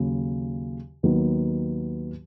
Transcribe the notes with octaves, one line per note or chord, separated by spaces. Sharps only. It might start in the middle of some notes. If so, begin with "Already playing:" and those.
Already playing: D#2 C#3 F#3
D#2 D#3 F#3 B3